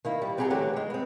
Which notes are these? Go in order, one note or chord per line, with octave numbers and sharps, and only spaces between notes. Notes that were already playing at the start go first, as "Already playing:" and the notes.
D#3 A#3 E4
G3
B3 C4 G4 G#4 F#5 A#5
D3 E3 F#3 A3 G4 A4
D#3 G#3
B3 C4